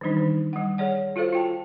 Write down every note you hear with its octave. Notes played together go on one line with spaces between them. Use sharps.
D#3 E3 G3 D4 D#4
D#3
G3 F#5
G#4 C#5 D5 F#5
F4 F#4 A4 C5 F5
F4 G5 A5